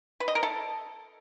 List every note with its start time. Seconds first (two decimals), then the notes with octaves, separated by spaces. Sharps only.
0.20 B4
0.28 D#5
0.35 A#4
0.43 A4